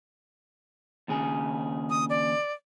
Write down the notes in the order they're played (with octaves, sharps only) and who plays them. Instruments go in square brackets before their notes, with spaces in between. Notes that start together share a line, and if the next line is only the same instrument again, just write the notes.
[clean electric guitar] D#2 C#3 G#4
[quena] D#6
D5